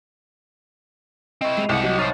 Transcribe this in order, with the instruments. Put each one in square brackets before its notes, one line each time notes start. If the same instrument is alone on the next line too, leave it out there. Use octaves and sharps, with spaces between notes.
[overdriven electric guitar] C4 E4 [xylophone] D#5 C#6
[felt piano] G#3 [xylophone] C7 D#7 F7
[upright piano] C2 [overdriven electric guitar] G4 F#5
[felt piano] F#3 [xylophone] D#5 G5
[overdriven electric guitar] D#4 C5 [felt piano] C#5 [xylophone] C#6 F6 A6